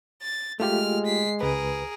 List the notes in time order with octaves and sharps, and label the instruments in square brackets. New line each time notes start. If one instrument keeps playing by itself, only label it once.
[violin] A6
[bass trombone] G#3 [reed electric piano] A3 F4 G4 [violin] F6
[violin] B6 C7
[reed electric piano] C#2 B4 [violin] G#4 A#4